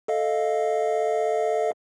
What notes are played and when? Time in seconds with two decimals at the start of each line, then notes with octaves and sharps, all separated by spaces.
0.08 A4 D#5 F5